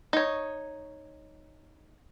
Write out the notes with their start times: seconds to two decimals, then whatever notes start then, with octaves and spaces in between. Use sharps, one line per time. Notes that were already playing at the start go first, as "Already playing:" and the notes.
0.13 D#4 C#5